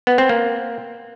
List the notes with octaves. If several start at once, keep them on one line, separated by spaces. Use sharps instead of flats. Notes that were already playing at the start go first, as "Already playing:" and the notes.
B3
C4
A#3